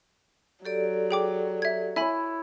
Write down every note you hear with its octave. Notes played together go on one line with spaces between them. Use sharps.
F#3 G4 A4 D5
G#4 G5 D6
E5 G#6
E4 C#5 E5 G#5 B5